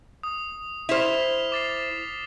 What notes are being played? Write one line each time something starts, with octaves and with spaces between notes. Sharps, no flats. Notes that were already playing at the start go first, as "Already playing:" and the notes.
D#6
E4 C5 F6 B6 F7
D6 A6 C7